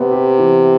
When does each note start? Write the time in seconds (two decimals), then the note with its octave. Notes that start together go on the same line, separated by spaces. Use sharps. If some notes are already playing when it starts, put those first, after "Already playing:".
Already playing: C3 B3
0.11 G4
0.38 E3